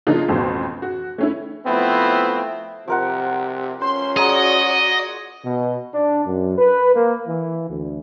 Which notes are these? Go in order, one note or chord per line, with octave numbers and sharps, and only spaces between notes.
C#3 F3 A#3 D4 D#4 F4
A1 F2 B2 C5
F#4
A3 C#4 E4
F3 A3 B3 C4 E4
C3 F3 A#4 F#5
C#4 C5 C6
F#4 G#4 D5 D#5 A#5
B2
D4
F#2
B4
A#3
E3
D2